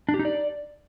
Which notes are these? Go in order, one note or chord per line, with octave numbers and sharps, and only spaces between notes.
D4
G4
D#4
D5